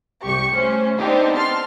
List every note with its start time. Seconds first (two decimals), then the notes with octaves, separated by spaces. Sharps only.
0.24 C2 G4 C#6
0.54 A3 C#4 C5
0.98 B3 C4 D4 D#4 G4 C5
1.34 A5 C6 F6